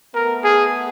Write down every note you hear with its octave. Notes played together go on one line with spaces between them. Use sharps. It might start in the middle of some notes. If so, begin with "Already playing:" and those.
A3 B3 A#4
G#4